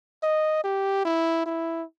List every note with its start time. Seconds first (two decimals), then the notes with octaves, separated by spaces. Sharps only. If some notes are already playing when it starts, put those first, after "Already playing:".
0.23 D#5
0.64 G4
1.05 E4
1.46 E4